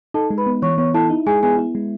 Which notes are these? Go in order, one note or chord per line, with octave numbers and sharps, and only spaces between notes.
D#4 A4 A5
G#3
B4 B5
B3
E3 C#5 C#6
B3 C#5 C#6
E4 A4 A5
D#4
G#3 G#4 G#5
B3 G#4 G#5
E4
G#3